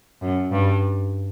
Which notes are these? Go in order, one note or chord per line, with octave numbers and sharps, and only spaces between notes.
F#2
G2